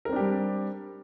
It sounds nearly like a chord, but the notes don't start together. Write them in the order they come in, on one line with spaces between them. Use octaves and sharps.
A#4 C4 D4 G4 G3